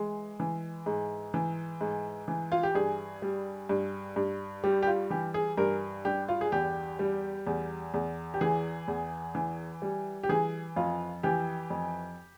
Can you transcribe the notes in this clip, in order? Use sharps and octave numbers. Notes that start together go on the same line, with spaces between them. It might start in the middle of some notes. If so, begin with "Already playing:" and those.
Already playing: E3 G#3
E3
G#2
E3
G#2
E3
F4
G4
G2 G#4
G3
G2
G2
G3 G4
G4
F4
E3 G4
G#4
G2 A#4
G2 G4
F4
G#4
E2 G4
G3
E2
E2
G4
E3 G#4
E2
E3
G3
G4
E3 G#4
F2 F4
E3 G4
F2